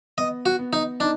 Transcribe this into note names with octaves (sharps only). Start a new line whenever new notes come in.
B3 D#5
F#4
B3
D#4
D4 D#4